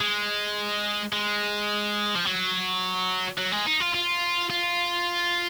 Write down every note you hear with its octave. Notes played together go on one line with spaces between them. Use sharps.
G#3
G#3
F3
F#3
F#3
G#3
D#4
F4
F4
F4